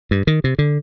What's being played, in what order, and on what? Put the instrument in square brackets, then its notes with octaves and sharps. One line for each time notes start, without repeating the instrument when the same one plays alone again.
[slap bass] G2
D#3
C3
D3